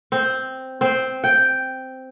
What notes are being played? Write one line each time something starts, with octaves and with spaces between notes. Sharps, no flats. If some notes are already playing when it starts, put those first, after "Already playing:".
C4
C4
G5